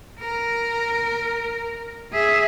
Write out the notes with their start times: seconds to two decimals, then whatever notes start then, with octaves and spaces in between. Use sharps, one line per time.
0.20 A#4
2.13 G#4 E5